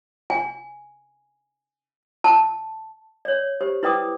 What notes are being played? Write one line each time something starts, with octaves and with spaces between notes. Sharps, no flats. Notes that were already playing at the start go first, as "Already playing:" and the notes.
G#5
A5
C#5 D5
G4 C5
E4 B4 D5 G5 D6 D#6